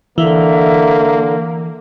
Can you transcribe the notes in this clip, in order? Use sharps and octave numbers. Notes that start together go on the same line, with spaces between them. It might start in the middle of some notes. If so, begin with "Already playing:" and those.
D3 E3 A#3 E5